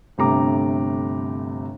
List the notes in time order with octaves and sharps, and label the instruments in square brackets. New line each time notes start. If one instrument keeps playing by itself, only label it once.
[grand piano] G1 C3 A3 A#5 D6